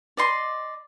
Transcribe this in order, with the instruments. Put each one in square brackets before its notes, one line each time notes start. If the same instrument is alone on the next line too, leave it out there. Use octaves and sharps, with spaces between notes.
[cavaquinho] D5 D#5 C6